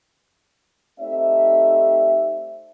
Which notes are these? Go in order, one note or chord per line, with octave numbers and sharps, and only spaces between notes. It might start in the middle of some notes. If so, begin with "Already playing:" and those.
A3 C4 D#4 G4 D5 E5